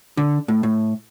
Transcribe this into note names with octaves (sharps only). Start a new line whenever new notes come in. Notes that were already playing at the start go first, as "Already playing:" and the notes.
D3
A2
A2